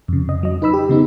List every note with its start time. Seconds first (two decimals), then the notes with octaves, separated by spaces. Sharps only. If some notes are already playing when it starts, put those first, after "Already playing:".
0.08 F2 C#3
0.29 D#5
0.43 F#3 D#5
0.62 D#4 B4 B5 E6
0.73 G4
0.89 C#3 B3 D#4